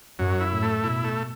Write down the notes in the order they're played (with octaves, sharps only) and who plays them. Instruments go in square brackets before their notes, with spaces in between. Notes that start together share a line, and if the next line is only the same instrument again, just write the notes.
[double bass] F#2 [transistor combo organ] F#3
[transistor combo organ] E4
[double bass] A2
[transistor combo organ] A3
[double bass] B2 [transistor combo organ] E4
[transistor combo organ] A3